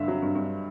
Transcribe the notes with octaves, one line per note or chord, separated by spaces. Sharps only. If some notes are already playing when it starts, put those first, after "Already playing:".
Already playing: G2 D3 E5 F5
F#3
G2
G2